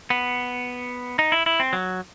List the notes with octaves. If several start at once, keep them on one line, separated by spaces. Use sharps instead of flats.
B3
D#4
E4
E4
C4
F#3